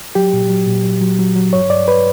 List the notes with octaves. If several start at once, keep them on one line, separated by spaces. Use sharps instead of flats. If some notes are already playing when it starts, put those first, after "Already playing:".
F#3 G4
A#2
F#3
A#2
F#3
F#3
F#3
F#3
G2 C#5
G2 D5
B4